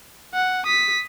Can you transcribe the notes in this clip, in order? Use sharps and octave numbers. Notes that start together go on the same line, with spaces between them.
F#5
D#6 B6